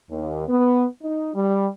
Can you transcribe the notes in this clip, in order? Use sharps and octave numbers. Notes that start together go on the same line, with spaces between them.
D#2
B3
D#4
G3